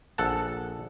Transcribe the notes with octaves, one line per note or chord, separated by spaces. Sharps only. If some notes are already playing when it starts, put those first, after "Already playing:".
A#1 A4 F#5 A5